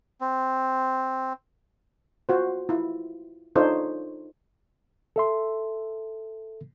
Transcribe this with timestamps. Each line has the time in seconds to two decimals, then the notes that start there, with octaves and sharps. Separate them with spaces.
0.21 C4
2.29 F4 F#4 C5
2.69 E4 F4
3.56 D4 D#4 F4 A4 C5 C#5
5.16 A4 E5 C6